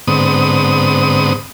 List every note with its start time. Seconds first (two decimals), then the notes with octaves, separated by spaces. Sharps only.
0.07 G#2 D3 B3 C4 D#6